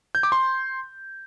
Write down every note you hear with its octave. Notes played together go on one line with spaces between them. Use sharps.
G6
D6
C6